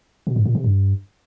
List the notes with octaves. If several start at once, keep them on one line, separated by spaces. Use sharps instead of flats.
B2
G#2
A#2
C3
G2